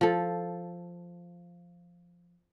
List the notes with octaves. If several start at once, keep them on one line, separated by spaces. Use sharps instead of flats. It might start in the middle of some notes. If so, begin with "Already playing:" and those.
F3 A4